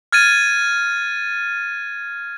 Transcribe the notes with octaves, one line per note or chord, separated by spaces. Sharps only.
F6 G#6 A6 D#7